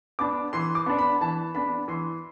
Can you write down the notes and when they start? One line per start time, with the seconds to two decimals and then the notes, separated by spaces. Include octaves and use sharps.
0.19 B3 D4 D6
0.53 E3 C6
0.75 D6
0.86 B3 D4
0.99 B5
1.21 E3 A5
1.55 B3 D4 B5
1.88 E3 C6